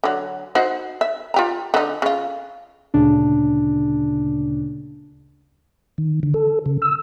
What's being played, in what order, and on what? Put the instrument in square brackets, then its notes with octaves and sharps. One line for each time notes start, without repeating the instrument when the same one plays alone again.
[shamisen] D3 F#3
D#4 F#4 C5
E5
F4 G4 A#5
D3 D#4
C#3 F4
[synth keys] D2 A#2 C#3 D4
[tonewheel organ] D#3
D3
A4
C#3
E6